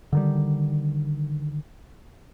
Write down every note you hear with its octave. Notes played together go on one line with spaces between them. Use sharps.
D3 D#3 G3